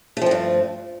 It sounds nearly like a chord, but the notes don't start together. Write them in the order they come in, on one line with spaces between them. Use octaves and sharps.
A3 F3 C4 G2